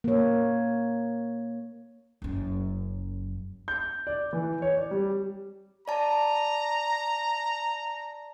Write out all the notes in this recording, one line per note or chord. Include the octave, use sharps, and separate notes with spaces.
A#3 C#5
F#1 F#2
G6
D5
E3
C#5
D5
G3
D5 A5 A#5